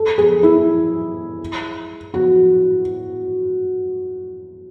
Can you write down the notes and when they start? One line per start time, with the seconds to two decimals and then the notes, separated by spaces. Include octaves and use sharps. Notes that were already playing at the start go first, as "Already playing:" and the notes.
Already playing: A4
0.18 G#4
0.43 E4
2.14 F#4